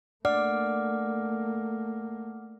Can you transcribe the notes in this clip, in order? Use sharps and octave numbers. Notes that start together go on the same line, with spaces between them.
A3 A#3 D5 F#5 D6 F6